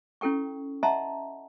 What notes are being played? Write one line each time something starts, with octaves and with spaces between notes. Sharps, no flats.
C#4 E4 A4 G5 C#6
D#5 E5 F#5 A5 A#5 C6